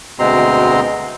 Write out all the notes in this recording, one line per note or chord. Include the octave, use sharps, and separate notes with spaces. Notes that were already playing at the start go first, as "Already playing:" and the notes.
D2 B2 G#3 C4 A#5 C6